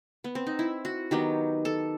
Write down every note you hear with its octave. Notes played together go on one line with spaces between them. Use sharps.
B3
C4
D#4
E4
F#4
D#3 F#3 B3 G4
A4